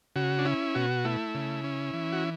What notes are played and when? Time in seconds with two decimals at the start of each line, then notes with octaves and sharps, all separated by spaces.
0.16 C#3 F#4
0.39 D4
0.45 C#4 E4
0.75 B2 F#4
1.05 A3 E4
1.35 C#3
1.64 C#4
1.93 E3
2.13 F#4